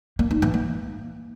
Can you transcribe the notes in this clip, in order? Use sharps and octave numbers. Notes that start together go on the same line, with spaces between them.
A#3
D#4
E3
A#3